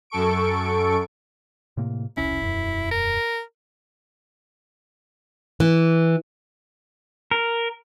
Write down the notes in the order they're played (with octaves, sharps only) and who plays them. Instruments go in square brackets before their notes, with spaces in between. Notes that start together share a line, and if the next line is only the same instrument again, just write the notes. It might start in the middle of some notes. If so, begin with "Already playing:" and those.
[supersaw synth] F#2 A4 C#6 D7
[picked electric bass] A2 C3 A#3
[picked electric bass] E1 C2 C#4 [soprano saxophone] E4
[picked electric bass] E1 F#2
[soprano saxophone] A#4
[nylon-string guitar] E3
[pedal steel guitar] A#4